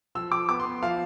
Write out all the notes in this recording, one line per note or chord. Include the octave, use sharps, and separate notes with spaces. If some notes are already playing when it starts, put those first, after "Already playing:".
F3 E6
F3 D6
B3 D6
C6
B3
F3 F5